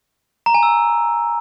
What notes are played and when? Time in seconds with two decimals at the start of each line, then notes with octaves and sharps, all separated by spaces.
0.46 A#5
0.54 G#5
0.63 E6